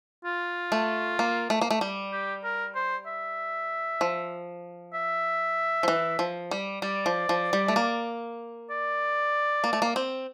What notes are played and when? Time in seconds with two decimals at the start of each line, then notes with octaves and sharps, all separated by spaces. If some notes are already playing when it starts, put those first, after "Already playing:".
0.25 F4
0.72 A3
1.19 A#3
1.50 A3
1.61 A#3
1.71 A3
1.81 G3
2.12 G4
2.44 A#4
2.75 C5
3.06 E5
4.01 F3
4.94 E5
5.83 F3
5.88 E3
6.19 F3
6.51 G3
6.82 G3 D5
7.06 F3
7.29 F3
7.53 G3
7.68 A3
7.76 A#3
8.70 D5
9.64 A#3
9.73 A3
9.82 A#3
9.96 C4